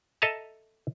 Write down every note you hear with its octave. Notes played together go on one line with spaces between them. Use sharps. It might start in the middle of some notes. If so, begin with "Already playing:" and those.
A4 D#5 E5 A5 A#5